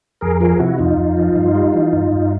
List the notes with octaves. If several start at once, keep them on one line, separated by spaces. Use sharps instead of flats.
F2 G#4 A#4
F3 G#4 A#4
C3 E4 F#4
F2 D#4 F4
F2
F3
G2
G3
E3
G2
G2